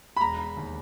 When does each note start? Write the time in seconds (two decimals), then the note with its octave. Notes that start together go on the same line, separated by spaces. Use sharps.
0.17 B5
0.21 E1 A#5
0.57 D#2